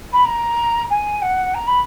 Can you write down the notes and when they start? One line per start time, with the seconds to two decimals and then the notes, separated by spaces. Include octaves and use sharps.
0.13 B5
0.25 A#5
0.90 G#5
1.22 F#5
1.55 A#5
1.67 B5